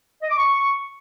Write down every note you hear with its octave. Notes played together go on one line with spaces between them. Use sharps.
D#5
D6
C#6